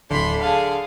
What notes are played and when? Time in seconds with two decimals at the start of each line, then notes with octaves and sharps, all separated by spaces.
0.10 D1 D3 B5 C6
0.41 G#4 F5 A5